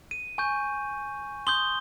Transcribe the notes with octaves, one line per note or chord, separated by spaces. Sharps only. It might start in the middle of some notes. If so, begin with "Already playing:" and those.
D#7
G#5 C#6 G6
C6 D#6 G6 G7